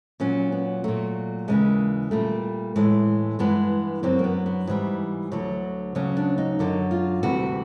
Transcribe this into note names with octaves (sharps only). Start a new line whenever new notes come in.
A#2 F#3 C#4
B3
A#2 F#3 A3
D#2 C#3 E3 G#3
A#2 G3 A3
A2 E3 G#3
G2 E3 G#3 B3
F#2 D3 F#3 C4
A#3
B3
B3
G#2 E3 G3
D2 D3 F#3
D2 C#3 F#3 C#4
D4
D#4
F#2 D3 F#3
F4
D2 C3 E3 G3 F#4